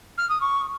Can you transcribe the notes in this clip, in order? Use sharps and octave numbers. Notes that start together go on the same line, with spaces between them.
F6
D#6
C#6